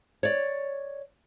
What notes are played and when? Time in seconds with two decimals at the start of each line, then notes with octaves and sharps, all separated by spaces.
0.23 C#5 D5